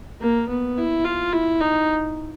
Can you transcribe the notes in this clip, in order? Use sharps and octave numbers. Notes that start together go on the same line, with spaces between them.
A#3
B3
E4
F4
E4
D#4